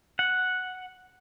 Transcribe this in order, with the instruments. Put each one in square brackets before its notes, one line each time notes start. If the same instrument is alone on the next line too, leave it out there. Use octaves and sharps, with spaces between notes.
[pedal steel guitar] F#5